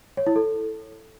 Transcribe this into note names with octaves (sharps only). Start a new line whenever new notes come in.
C#5
E4
A4